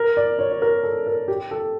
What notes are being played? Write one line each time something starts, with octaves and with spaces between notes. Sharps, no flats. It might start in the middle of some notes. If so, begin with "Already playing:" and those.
Already playing: A#4
D5
C#5
C#5
A#4
A4
A#4
G4
A4